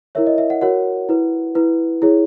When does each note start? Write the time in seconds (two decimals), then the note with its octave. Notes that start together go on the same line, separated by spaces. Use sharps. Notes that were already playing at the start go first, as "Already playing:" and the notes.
0.15 E4 A#4 C#5 E5
0.27 D#5
0.38 E5
0.50 F#5
0.61 F#4 A#4 C#5 F#5
1.09 E4 B4
1.55 E4 B4
2.02 E4 G#4 C#5